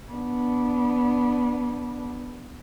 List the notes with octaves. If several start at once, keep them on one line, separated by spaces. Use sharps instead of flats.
B3 D4